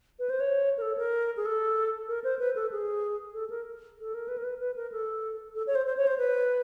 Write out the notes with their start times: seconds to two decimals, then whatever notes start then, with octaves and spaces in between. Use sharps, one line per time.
0.19 B4
0.30 C5
0.40 C#5
0.78 A#4
0.82 A4
0.98 A#4
1.37 G#4
1.45 A4
2.08 A#4
2.24 C5
2.39 B4
2.55 A4
2.71 G#4
3.34 A4
3.50 A#4
4.01 A4
4.14 A#4
4.28 B4
4.38 A#4
4.44 B4
4.60 B4
4.76 A#4
4.92 A4
5.55 A4
5.67 C#5
5.75 C5
5.86 C5
5.97 C#5
6.07 C5
6.18 B4